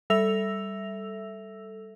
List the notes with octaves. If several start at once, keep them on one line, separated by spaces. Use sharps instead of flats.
G3 A4 E5 E6 A#6 F7